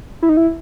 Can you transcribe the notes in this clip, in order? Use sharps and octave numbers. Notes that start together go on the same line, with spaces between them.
E4
D#4
E4